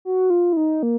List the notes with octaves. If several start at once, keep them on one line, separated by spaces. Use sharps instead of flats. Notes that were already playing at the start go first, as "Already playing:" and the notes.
F#4
F4
E4
D#4
A#3